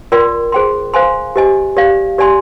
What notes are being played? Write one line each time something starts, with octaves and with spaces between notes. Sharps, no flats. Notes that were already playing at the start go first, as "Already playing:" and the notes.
F4 A#4 D5 G5 C6
G#4 C5 G5 C6
C5 F5 G#5 C6
G4 C5 D#5 G#5
G4 D5 F5
G4 D5 G#5 C6